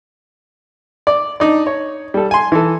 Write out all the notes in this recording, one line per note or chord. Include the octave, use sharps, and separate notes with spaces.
D5
D4 D#4 D5
C#5
G3 A4
G#5 C6
E3 A4